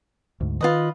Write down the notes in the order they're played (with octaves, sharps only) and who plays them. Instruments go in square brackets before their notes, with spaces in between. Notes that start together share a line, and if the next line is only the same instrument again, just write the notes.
[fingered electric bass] D2 G#2
[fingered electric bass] D#3 [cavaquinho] F4 B4 D#5